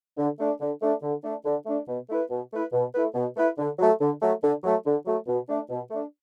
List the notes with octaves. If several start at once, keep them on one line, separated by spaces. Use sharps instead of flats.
D3
A3 D4
D3
A3 D4
D3
A3 D4
D3
A3 D4
B2
A3 E4 B4
B2
A3 E4 B4
B2
A3 E4 B4
B2
A3 E4 B4
D3
F#3 A3
D3
F#3 A3
D3
F#3 A3
D3
F#3 A3
B2
A3 D4
B2
A3 D4